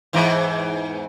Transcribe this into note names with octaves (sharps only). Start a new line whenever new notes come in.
E2 G#2 E3